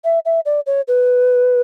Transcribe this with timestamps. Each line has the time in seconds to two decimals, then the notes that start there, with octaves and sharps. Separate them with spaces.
0.04 E5
0.25 E5
0.45 D5
0.66 C#5
0.88 B4